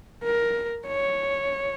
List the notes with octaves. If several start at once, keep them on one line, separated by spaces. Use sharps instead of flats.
A#4
C#5